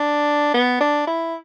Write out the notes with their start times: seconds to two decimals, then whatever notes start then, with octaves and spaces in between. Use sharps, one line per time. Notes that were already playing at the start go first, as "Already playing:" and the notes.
Already playing: D4
0.54 B3
0.81 D4
1.07 E4